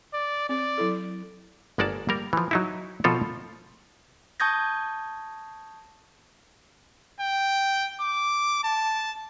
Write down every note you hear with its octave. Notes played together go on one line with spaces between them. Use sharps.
D5
C4 D5
F#3 E4 A4
G1 G#3 A#3 D5 F#5 A5
G3 A#3 A#4
E3 F3
F#3 D#4 E4
B2 F3 C4 F4 A4 A#4
A5 C#6 D#6 G6 G#6 A#6
G5
D6
A5